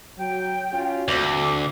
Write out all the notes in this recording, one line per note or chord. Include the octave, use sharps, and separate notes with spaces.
F#3 G5
C#4 F4 F#4
D2 A3 C4 F#4 D6 E6